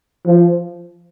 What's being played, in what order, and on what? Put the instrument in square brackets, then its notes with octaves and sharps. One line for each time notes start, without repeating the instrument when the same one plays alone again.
[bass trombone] F3